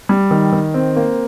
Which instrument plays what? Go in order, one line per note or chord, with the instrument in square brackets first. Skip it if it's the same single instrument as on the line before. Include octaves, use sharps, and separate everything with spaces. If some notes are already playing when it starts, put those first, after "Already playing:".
[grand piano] G3
D#3
D#3
C4
A#3